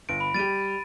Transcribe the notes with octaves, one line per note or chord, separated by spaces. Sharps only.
G1 D7
B5
G3 G4 A6 D#7